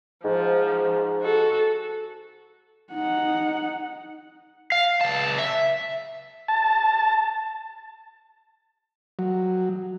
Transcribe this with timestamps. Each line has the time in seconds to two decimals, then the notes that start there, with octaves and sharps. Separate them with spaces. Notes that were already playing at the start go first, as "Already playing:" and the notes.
0.25 G#2 F3
1.21 F#4 A4
2.93 D#4 F#5
4.72 F5
5.01 C#2 A5
5.38 E5
6.48 A5
9.19 F#3